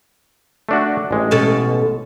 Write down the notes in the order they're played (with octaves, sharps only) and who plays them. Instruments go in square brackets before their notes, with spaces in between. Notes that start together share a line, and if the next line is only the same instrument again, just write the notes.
[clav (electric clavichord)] A3 D4 F#4
A1 G#3
[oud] B2 C#4 A4